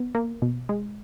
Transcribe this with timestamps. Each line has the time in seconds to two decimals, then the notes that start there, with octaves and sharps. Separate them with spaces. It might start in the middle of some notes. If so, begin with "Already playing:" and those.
Already playing: B3
0.15 A#3
0.42 B2
0.69 G#3